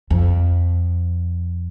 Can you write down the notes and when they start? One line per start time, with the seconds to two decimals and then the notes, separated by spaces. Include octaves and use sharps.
0.10 F2